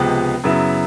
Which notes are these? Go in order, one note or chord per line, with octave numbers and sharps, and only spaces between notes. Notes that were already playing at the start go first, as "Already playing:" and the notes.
Already playing: C#2 C3 F3 G#3 B3
F#2 C#3 F#3 B3 E4